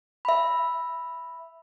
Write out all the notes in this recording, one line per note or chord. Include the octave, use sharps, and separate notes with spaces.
E5 B5